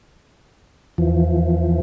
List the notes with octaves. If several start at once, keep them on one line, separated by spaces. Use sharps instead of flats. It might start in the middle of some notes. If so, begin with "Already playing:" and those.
E2 E3 F3